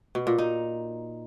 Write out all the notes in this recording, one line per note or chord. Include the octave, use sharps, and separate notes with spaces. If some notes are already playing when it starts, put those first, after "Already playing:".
B2
A#2
D#4